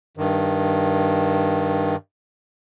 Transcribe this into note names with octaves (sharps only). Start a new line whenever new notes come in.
G2 D#3